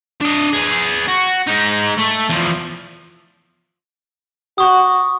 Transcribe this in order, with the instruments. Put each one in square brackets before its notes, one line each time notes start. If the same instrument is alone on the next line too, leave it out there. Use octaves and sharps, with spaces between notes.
[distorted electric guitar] D4 D#5
G#4 B4
F#4
G#3 D#4
A3
E2 F3
[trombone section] F#4 [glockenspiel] C#6 D#6